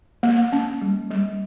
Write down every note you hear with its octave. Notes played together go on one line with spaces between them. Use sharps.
A#3
C#4
G3
G3